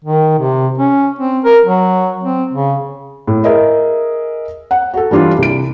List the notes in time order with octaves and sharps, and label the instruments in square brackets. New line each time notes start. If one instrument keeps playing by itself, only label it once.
[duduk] D#3
C3
C#4
C4
A#4
F#3
C4
C#3
[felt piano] A2
G#4 A#4 D#5 E5
F#5
F#4 A4
E3 G3 D4 F4
C2 D7